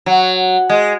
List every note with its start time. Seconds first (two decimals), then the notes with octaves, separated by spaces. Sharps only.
0.06 F#3
0.69 G#3